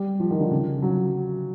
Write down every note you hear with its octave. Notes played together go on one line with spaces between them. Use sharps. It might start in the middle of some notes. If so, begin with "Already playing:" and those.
Already playing: G3
F3
D#3
D3
C#3
F#3